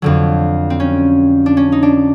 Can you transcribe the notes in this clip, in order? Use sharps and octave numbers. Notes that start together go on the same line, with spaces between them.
F2 D3 F#3
C4
C#4
D4
C#4
D#4
D4